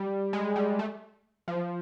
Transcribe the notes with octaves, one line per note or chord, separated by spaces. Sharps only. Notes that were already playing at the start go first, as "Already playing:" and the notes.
Already playing: G3
G#3
G3
A3
F3